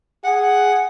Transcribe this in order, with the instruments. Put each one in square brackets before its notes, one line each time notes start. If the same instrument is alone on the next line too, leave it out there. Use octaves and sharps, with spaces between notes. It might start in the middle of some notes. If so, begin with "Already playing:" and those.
[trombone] G#4 [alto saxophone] F#5